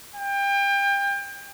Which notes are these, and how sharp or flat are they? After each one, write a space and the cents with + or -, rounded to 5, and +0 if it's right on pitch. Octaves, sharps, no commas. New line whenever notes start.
G5 +30